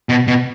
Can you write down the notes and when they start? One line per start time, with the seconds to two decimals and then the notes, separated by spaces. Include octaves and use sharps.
0.09 B2
0.27 B2